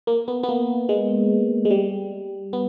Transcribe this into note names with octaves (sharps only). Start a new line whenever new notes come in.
A#3
B3
B3
A#3
G#3
G#3
G3
B3